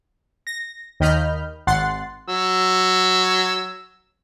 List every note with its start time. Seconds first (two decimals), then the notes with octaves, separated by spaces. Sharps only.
0.47 A#6
1.00 D#2 D#3 D#5 B5 F6 G6
1.67 G#1 F#5 C6 F#6 A6 C7
2.28 F#3 E6